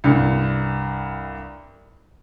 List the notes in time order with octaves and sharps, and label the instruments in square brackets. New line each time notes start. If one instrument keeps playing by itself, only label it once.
[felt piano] C2 G2